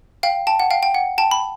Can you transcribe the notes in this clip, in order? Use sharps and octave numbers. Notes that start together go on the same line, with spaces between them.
F5 G5
G5 A5
F#5
F5 G5
G5
F#5
G5 A5
B5